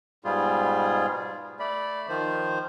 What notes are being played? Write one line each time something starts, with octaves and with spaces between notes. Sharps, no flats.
G#2 B2 G3 F4 G#4
A3 D5 B5
D#3 F3 C5